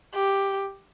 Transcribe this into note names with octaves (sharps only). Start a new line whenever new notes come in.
G4